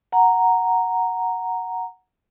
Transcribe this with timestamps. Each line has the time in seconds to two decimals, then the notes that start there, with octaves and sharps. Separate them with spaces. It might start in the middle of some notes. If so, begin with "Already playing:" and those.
0.12 F#5 A#5